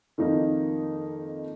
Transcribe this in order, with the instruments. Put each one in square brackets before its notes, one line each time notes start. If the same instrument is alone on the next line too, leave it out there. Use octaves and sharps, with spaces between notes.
[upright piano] F2 D#3 A#3 D#4